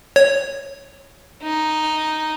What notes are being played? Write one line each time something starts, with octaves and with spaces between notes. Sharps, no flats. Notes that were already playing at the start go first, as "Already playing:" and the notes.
C#5
D#4